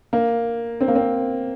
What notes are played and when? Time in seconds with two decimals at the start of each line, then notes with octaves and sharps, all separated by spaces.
0.13 A#3
0.81 C4
0.88 A#3
0.95 C4